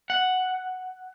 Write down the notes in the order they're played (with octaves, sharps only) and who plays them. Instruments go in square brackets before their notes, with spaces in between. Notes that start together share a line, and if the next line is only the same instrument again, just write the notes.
[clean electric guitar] F#5